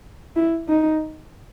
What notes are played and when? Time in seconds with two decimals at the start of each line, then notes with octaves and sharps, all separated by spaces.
0.36 E4
0.68 D#4